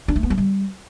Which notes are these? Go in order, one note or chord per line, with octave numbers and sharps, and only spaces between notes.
D4
A3
B3
F#3
G3